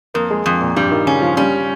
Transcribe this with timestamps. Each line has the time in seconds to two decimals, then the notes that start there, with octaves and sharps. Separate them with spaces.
0.14 F2 A#3
0.31 G#3
0.46 F2
0.61 A#2
0.76 G2 G3
0.91 D#3
1.06 C#3 C#4
1.22 F3
1.37 G3 C#4